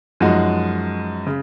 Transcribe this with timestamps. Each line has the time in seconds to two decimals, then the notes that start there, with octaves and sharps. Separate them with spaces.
0.20 F#2 F3 G#3 D#4 F#4
1.27 C#3